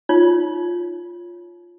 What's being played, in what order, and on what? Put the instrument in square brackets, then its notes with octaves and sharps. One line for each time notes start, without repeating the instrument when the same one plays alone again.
[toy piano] D#4 F4 C#5